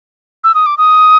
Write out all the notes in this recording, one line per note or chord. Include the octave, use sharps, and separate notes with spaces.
E6
D#6
D6
D#6